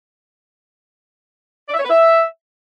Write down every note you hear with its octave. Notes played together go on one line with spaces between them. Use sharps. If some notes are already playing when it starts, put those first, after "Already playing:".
D5
E5
C#5
B4
E5